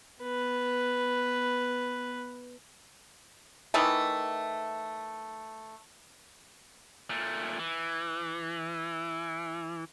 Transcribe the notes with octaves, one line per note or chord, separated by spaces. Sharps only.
B3 B4
D#3 E3 A3
A#2 A3
E3